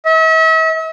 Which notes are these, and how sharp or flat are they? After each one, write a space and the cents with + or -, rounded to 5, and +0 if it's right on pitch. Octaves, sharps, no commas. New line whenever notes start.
E5 -40